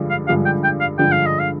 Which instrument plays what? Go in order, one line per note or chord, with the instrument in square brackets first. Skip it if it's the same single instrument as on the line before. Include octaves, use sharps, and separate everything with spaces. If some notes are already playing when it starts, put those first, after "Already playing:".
Already playing: [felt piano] G2 D3 F3 G#3
[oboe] F5
[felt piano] G2 D3 F3 G#3 [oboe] F5
[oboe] G5
G5
F5
[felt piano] G2 D3 F3 G#3 [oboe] G5
[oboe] F5
D#5
F5